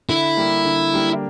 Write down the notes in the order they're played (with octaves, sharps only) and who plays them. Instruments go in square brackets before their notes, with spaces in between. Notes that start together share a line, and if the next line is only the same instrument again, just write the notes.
[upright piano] D3 [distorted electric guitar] E4
[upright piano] G3 A#3 D4 G4
D3
G3 A#3 D4 G4